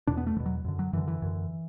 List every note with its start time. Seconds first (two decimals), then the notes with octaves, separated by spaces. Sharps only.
0.07 E2 B2 D4
0.17 B3
0.27 A3
0.36 E2 E3
0.39 B2
0.46 F#3
0.65 F#2 D3
0.79 F#3
0.93 F#2 D3 E3
1.08 E3
1.22 F#2 D3